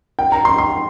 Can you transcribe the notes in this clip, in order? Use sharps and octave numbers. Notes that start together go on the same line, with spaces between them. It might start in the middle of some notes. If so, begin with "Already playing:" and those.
G5
A#5
C6
C6